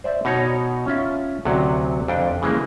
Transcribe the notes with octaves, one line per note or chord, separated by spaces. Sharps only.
C5 D5 E5
B2 D#4 C#5 A#5
C#4 F4 E5
D2 C3 F#3 F#5
F2 D4 G5
C#3 E3 G#3 A#3